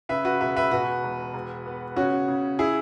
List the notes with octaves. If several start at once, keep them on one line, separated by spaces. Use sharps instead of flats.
C#3 B4 E5
F#4 B4
E1 B4 E5
B4 E5
B2 F#4 B4
E1
E1
B3
C#3 C#4 F#4
C#3
E4 G#4